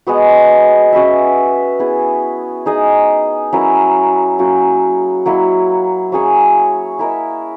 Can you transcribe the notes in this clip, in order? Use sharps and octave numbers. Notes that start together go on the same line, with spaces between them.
G#3 B3 F#4
C#4 F#4 B4 E5
B3 E4 G#4
D#4 G#4 D#5
F#3 C#4 E4 A#4
F#3 A#3 C#4 F#4
F#3 A#3 E4
F#3 C#4 G#4 C#5
E4 A#4 E5